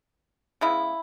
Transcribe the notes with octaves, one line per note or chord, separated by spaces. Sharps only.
C#3 G#3 B3 E4